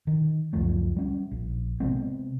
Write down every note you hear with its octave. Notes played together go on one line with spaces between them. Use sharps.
D#3
C#2 F#2 F3 A3
G3 C#4
A#1
C3 G#3 B3 C4